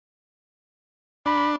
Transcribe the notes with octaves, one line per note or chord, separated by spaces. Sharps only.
D4 B5